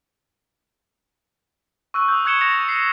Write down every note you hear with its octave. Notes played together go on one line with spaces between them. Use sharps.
C#6 E6 F#6 D#7
D#6 E6 G6
C#6 F#6 G#6 C#7 E7 G7
C#6 A6 A#6 C#7 E7 F7
C7